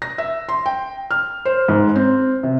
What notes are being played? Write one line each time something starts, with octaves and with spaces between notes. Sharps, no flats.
A#6
E5
C6
G5
F6
C5
G#2
C4
C3